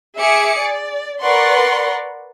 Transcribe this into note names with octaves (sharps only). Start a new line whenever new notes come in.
G#4 E5 G#5 D6 C#7
D5
A#4 B4 D5 F#5 C6 C#6